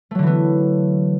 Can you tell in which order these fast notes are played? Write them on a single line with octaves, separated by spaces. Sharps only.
A3 F#3 D3 E3 B3